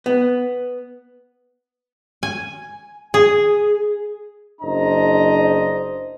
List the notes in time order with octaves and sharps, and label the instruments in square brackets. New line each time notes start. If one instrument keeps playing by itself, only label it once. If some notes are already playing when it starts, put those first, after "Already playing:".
[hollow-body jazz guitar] B3
[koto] G#5
G#4
[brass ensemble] F#1 D4 C5 D#5 A#5